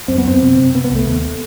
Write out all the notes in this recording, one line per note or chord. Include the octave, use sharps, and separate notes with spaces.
F#2 C4
B3
F#2 C4
C3
C3
C3 B3
B3
C2 A3
D#2